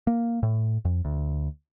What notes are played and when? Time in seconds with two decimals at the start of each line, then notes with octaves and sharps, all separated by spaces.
0.07 A#3
0.43 A2
0.85 F2
1.05 D2